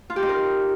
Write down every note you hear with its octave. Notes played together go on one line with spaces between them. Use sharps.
F4
G4
D#4
A#4